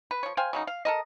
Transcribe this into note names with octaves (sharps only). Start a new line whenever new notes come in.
B4
F3 C#5
C5 F5 G5 G#5
C#3 F#3 D#4
F5
A4 A#4 D#5